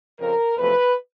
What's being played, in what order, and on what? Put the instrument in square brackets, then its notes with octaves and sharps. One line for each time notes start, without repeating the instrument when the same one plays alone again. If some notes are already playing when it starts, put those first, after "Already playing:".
[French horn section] F2 C#3 F3 A#4
E2 C3 F3 A3 B4